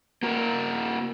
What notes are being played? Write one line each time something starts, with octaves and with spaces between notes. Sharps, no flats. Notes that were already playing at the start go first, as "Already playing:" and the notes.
A#3 F#4 A#4